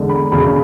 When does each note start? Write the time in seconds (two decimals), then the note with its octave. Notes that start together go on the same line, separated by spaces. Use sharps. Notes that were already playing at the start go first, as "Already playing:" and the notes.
Already playing: E2 D3 G#3
0.09 B5
0.31 E1 E2 C#3 B5